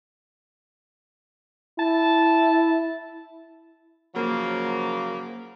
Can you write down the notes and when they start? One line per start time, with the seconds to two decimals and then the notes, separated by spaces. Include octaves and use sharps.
1.79 E4 A5
4.15 C#3 F3 F#3 A#3